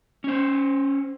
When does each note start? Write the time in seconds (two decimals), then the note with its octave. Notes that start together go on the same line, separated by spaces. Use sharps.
0.24 C#4 C5